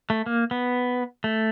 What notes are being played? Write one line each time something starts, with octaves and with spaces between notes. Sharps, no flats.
A3
A#3
B3
A3